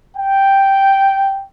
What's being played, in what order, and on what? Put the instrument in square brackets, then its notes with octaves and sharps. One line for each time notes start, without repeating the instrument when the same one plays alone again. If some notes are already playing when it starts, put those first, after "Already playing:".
[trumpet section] G5